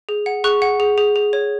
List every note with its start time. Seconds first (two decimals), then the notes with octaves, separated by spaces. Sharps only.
0.09 G#4
0.26 F#5
0.44 G#4 C#6 F#6
0.62 F#5
0.80 G#4
0.98 G#4
1.16 G#4
1.33 C#5